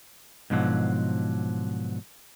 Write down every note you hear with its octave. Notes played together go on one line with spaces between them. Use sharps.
G#2 B2 D3 F3 F#3